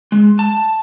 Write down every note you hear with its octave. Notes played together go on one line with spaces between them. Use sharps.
G#3
A5